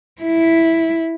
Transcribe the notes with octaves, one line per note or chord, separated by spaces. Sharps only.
E4